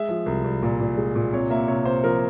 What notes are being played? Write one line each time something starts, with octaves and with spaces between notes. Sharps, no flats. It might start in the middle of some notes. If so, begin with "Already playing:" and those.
Already playing: G#3 E5
F3
C2
C2
A#2
A#2
G#3
A#2
C3 C#5
A#3 E5
C3 C#5
C3 C5
F3 A#4